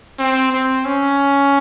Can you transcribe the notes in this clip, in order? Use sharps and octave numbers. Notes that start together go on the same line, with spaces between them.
C4
C4
C#4